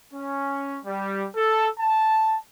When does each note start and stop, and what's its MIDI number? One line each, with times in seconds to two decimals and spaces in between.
0.14 0.78 61
0.86 1.26 55
1.37 1.69 69
1.80 2.37 81